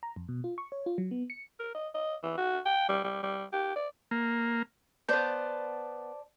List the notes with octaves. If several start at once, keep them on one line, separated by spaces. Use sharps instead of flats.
A#5
F2
B2
F4
C#6
C#5
F4
F#3
B3
C#7
A#4
D#5
D#5
E3
F#4
G5
G3
G3
G3
G4
D5
A#3
B3 C5 D5 A5 G6